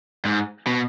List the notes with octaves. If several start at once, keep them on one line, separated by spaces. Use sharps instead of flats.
G#2
B2